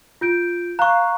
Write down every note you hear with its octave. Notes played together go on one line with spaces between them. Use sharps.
F4 G6 D7
F5 A#5 C#6 F#6